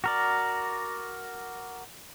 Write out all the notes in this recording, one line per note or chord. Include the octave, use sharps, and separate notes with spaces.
F#4 A#4 D5